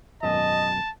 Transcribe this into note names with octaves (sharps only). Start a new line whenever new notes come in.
G#1 F#2 B2 D#5 A5